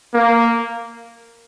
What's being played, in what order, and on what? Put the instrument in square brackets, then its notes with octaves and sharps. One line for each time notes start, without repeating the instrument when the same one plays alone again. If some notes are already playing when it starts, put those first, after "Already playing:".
[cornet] A#3